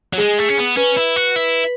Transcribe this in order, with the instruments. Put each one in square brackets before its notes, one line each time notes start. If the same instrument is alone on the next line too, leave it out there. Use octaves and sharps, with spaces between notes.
[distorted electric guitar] F#3
[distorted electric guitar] G#3 [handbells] G#4
[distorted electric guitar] A3
C#4
B3
[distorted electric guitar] C#4 [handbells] B4
[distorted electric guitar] E4
F#4
E4